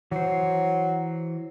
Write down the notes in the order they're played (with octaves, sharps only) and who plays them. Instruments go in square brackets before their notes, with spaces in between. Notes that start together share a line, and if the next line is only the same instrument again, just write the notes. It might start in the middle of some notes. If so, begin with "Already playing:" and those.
[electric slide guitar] E3 C5 [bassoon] F#3